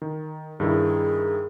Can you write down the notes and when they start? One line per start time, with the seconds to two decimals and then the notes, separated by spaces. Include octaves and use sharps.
0.02 D#3
0.60 G2 D#3 E4 G#4